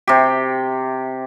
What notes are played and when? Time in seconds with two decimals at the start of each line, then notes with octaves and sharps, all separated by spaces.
0.07 C3 G4